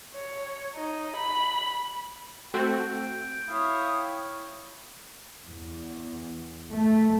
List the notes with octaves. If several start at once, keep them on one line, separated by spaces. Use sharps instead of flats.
C#5
D#4
B5
A3 C4 F#4 G5
E4 C#5 E5 F5 D#6
E2
A3